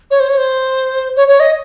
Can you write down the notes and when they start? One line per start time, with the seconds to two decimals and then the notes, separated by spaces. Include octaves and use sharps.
0.11 C#5
0.20 C5
0.29 C#5
0.37 C5
1.16 C#5
1.28 C#5
1.40 D#5